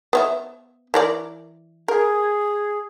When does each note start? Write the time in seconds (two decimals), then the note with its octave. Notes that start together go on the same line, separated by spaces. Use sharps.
0.13 B3 C#5 E5
0.94 E3 A#4 D5
1.88 G#4 A#4